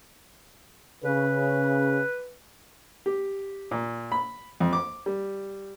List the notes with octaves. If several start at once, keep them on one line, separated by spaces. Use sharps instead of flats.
C#3 B4
G4
A#2
B5
F2
D6
G3